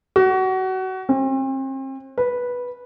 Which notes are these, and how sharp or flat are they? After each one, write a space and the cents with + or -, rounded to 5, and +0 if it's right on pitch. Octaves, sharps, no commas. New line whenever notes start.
F#4 +25
C4 +40
B4 -10